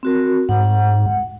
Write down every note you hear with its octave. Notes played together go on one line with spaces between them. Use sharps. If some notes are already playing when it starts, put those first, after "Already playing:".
C4 F#4 A#4
G#2 F#5